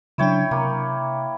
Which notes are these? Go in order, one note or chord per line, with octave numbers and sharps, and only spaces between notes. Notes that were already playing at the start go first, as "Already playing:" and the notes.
C#3 F#3 D4 E4 C#5 G5
C3 A#3